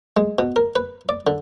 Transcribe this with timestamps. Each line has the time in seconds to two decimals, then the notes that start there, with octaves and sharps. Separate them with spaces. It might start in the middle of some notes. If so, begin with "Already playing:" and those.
0.17 G#3
0.39 B2
0.56 A#4
0.76 B4
1.09 D5
1.27 D3